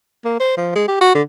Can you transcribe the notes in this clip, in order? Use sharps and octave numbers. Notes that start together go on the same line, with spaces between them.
A#3
C5
F3
G#3
G4
F#4
D3